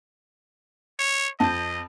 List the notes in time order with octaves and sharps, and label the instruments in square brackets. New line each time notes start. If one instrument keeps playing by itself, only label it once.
[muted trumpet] C#5
[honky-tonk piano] F2 [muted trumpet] D#5 [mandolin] A5 G6